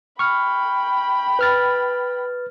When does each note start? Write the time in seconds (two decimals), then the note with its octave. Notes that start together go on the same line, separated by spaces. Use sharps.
0.19 G5 B5 C#6 F6
1.39 B4 F6 A6